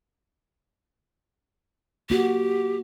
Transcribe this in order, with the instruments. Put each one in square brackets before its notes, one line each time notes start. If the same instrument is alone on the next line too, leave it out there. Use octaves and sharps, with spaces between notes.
[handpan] A#3 F#4 [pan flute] G4